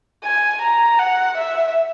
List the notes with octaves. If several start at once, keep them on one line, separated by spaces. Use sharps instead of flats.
G#5
A#5
F#5
E5